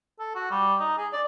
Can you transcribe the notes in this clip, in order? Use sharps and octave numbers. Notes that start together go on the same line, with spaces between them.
A4
F#4
G3
D#4
G#4
D5